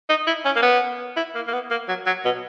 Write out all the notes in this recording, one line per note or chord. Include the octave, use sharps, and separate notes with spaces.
D#4
E4
C#4
A#3
B3
E4
A#3
A#3
B3
A#3
F#3
F#3
B2